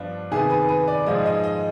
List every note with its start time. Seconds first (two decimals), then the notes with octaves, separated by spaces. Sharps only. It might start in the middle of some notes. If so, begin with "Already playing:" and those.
Already playing: G2 F3 B3 D4
0.31 C3 D#3 B3 G#4
0.50 B4
0.69 B4
0.88 D5
1.06 G#2 F3 G#3 D#5
1.26 D#5
1.44 D#5